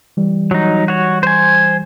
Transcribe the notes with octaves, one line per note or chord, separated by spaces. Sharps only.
E3 G3
F#3 D#4
F#4 C#5
C5 G#5